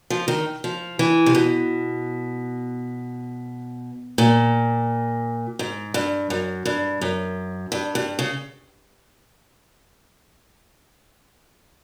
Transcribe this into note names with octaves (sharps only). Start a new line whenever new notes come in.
F3
D#3
F3
E3
C3
B2
A#2
G#2
G2
F#2
G2
F#2
G2
G2
C#3